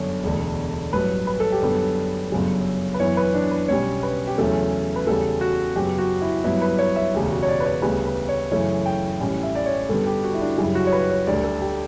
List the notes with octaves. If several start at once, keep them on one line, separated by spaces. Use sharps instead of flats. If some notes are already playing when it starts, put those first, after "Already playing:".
Already playing: G1 F#2 D3 C#5
E1 D2 D3
A1 G2 F#3 B4
B4
A4
G4
F#2 D3 G3 B3 A4
G1 F#2 C#3 F#3
B4
F#2 E3 B3 C#5
B4
D4
B4
B1 B2 G3 C#4 C#5
B4
G4
E2 C#3 F#3 A3 C#4 A4
B4
E2 C#3 G3 A4
F#4
F#2 C#3 F#3 B3 G4
F#4
E4
G2 F#3 B3 E4
B4
C#5
E5
E1 D2 C#3 G4
F#4
C#5
D5
B4
C#5
D2 C#3 G3 B3 B4
B4
C#5
F#2 C#3 E3 A3 C#5
G5
A1 A2 G3 C#4
E5
D5
C#5
G2 D3 G3 B3 A4
G4
F#4
E4
D4
F#2 C#3 G3 E4
F#4
C#5
B4
C#5
D2 D3 G3 D5
A4
G4